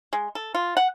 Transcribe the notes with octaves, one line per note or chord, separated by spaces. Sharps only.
G#3
A4
F4
F#5